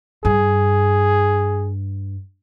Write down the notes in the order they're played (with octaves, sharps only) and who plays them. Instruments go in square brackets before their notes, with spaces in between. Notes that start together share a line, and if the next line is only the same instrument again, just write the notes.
[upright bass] G2 [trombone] G#4